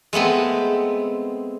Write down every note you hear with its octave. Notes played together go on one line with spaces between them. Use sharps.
G#3 A3 B3 C4